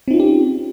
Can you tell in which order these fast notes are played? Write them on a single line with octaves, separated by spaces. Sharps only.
C4 D#4 F4 C#4 G4